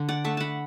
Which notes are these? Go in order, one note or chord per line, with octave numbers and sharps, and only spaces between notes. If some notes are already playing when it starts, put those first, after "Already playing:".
Already playing: D3
D5 F#5
A3 E5 A5
F#5 A5 B5